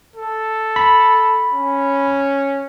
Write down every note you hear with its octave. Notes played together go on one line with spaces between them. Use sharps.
A4
B5
C#4